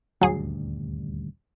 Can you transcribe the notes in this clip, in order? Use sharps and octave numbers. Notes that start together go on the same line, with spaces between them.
D#1 D2 G2 F#3 G#4 C7